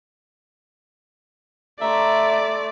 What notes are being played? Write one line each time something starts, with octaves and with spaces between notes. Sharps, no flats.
A3 D5 E5 A#5 C6 C#6